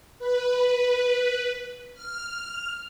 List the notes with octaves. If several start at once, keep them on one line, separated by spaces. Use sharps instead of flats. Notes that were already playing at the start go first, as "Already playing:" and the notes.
B4
F6